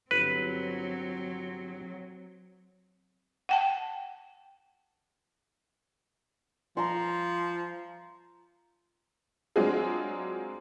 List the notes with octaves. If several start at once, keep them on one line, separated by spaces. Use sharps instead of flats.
G1 F#3 C4 B4
F#5 G5 A5
F3 A#5 C6
F#3 G#3 C4 D4 F4 G#4